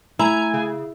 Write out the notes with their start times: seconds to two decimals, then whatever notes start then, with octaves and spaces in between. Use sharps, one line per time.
0.19 A3 E4 G#5 A#5
0.54 C#3